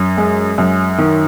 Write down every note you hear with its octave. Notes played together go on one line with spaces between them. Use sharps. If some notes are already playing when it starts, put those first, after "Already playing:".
Already playing: F#2
G#3
F#2
D#3